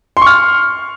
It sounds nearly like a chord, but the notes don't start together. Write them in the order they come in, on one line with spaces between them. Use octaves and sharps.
C6 C#6 F6